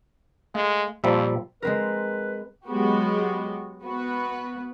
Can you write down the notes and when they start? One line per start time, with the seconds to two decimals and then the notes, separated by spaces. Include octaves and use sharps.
0.55 G#3 A3 F5
1.04 F2 A#2 F3 G3 E5
1.62 G#3 C4 A#4 B4
2.66 F#3 G#3 B3 F#4 G4
3.83 B3 F#4 B4